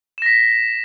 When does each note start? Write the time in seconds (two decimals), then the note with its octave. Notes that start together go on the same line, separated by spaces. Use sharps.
0.18 E7
0.22 A#6
0.26 B6